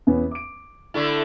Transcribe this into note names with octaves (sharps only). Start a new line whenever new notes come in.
E2 B3 C#4
D6 D7
D3 A3 E4